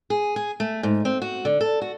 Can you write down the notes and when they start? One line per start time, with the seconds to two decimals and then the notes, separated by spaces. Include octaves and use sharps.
0.10 G#4
0.36 G#4
0.60 A3
0.83 G#2
1.05 C4
1.22 F#4
1.45 D3
1.61 A4
1.82 F#4